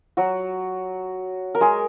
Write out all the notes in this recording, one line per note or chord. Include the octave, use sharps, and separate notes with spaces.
F#3 F#4
A#4
G#3 G#4